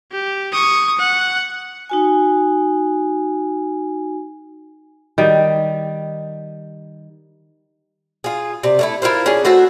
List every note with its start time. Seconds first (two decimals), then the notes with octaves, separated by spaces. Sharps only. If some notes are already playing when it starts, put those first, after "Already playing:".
0.12 G4
0.52 C#6 D#6
0.99 F#5
1.90 D#4 F#4 G#5
5.18 D#3 G3
8.24 F4 G#4
8.63 C3 D5
8.79 A3 C#4 E4
9.02 E4 F4 A#4 C5
9.26 C#4 D4 G#4
9.45 A3 F#4 C5 E5